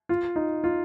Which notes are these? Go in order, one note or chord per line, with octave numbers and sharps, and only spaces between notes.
F4
D#4
F4